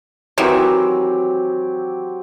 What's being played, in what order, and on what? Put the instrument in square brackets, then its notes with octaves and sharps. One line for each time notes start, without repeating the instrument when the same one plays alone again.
[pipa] D#3 E3 [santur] F#3 C4 G4